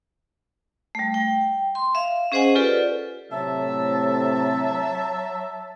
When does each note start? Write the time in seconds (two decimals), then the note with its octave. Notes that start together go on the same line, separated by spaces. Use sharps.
0.95 G3 A3
1.14 G5
1.75 C6
1.95 E5 F5
2.32 C#4 G#4 C5 D#5 F#5 G#5
2.55 F4 G4 A4 B4 D5
3.31 A2 C3 F#3 E5 A5